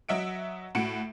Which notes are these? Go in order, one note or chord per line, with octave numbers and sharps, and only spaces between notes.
F#3 D#5 E5 F#5 D7
A2 F#4 C#7 D7